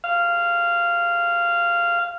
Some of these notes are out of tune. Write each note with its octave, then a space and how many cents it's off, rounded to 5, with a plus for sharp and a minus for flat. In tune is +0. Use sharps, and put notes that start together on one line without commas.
F5 -15